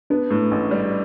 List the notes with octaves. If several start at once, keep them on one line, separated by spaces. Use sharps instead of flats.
B3 D4
A2
A1
G3